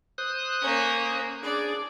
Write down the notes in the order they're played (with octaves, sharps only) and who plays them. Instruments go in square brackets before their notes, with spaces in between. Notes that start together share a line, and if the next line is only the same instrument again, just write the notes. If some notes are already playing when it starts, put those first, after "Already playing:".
[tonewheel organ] C5 D#6 F#6
[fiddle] A#3 C#4
[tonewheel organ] D4 G#4 [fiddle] D5